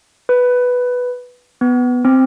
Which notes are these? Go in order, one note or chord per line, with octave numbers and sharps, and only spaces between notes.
B4
B3
C4